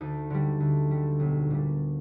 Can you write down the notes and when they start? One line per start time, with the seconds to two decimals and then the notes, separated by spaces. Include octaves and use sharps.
0.01 D2 D#4
0.30 D3 G3
0.60 D2
0.91 D3 G3
1.20 B1
1.50 A#2 G3